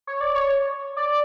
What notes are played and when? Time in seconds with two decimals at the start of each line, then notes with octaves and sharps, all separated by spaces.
0.07 C#5
0.21 D5
0.35 C#5
0.97 D5